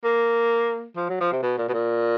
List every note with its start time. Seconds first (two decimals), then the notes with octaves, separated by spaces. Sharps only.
0.05 A#3
0.97 F3
1.09 F#3
1.21 F3
1.32 C3
1.43 B2
1.58 A#2
1.69 B2
1.73 A#2